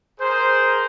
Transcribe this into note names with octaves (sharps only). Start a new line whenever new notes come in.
G#4 A#4 C5